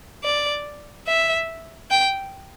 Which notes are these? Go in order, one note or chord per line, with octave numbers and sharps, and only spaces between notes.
D5
E5
G5